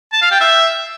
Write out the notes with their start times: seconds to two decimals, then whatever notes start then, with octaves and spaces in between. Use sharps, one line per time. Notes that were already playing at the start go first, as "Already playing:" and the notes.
0.13 A5
0.22 F5
0.31 G5
0.40 E5